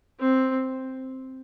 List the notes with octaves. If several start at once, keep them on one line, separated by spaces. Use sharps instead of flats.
C4